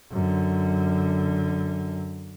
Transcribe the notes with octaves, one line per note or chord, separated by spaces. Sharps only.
F#2 D3